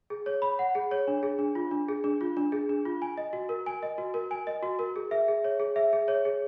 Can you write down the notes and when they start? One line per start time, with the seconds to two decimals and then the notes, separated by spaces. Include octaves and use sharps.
0.10 G#4
0.26 C#5
0.42 B5
0.59 F#5
0.75 G#4
0.91 C#5
1.08 D4
1.23 G#4
1.39 D4
1.55 F4
1.71 D4
1.88 G#4
2.04 D4
2.21 F4
2.37 D4
2.52 G#4
2.69 D4
2.85 F4
3.02 G#5
3.17 D#5
3.33 F#4
3.49 A#4
3.66 G#5
3.83 D#5
3.98 F#4
4.14 A#4
4.31 G#5
4.47 D#5
4.63 F#4
4.79 A#4
4.96 G#4
5.11 E5
5.28 G#4
5.44 C#5
5.59 G#4
5.76 E5
5.93 G#4
6.08 C#5
6.25 G#4